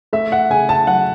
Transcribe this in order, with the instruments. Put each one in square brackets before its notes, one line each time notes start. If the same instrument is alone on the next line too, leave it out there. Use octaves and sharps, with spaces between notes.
[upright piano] A3 E5
F#5
C#3 G#5
A5
F#3 F#5